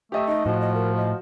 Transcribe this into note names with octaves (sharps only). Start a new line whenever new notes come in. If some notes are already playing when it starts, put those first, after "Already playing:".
A3 G4 D#5 E5
D#4 D#5
A2 F3 F#4
D#5
A#4
D#5